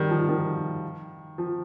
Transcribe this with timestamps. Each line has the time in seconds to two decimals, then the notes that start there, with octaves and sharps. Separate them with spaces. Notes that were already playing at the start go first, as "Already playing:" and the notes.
Already playing: D#3 G3
0.10 F3
0.29 D#3
1.38 F3